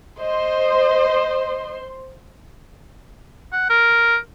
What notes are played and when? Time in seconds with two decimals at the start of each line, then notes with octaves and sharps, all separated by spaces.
0.19 C5 D#5 C6
3.52 F#5
3.70 A#4